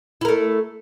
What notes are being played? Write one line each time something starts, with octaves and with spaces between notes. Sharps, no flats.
A3 E4 A#4